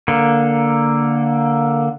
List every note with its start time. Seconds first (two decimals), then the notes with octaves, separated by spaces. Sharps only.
0.08 D3 A#3